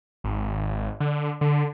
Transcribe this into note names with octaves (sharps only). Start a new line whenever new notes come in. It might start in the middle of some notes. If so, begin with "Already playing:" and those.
G#1
D3
D3